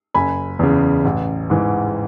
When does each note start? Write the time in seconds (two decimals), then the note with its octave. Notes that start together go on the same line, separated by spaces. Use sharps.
0.14 F#1 G#5 B5
0.59 E2 C#3
1.05 A1
1.50 G#2 E3